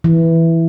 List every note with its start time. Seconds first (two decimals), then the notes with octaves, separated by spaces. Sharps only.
0.04 E3